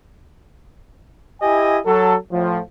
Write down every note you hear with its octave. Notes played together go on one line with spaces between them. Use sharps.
E4 G4 D#5 G#5
F#3 A4
A2 F3